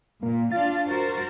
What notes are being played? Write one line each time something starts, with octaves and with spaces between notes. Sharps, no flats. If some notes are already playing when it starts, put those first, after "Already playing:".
A#2 A#3
D4 F4 F5 A6
F#4 A#4 C5